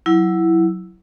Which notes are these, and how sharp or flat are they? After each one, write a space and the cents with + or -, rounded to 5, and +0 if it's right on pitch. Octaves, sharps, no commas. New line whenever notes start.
F#3 +0 E4 +0